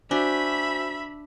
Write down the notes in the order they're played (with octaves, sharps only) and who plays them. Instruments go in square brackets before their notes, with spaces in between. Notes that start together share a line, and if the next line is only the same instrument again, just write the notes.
[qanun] D4 [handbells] F#4 C5 G#5 [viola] E5 B5